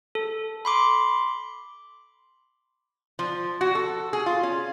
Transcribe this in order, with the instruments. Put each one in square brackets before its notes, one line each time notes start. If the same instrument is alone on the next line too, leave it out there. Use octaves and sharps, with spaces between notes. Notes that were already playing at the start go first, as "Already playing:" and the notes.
[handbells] A4
B5 C6 D6
[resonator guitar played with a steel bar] F3
F#4
A4
G#4
F4
C#4